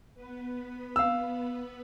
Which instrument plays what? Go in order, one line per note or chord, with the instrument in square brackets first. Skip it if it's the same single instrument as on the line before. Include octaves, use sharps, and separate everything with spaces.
[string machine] B3 B4
[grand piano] F5 E6